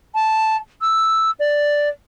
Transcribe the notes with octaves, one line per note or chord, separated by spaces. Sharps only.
A5
E6
D5